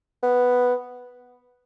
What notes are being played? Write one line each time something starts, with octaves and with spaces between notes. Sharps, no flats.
B3